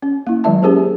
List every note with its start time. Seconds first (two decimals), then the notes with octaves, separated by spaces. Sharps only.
0.02 C#4
0.27 A#3 E4
0.44 D#3 F#3 G#3 E5 A5
0.62 C#4 G4 G#4 A#4 C5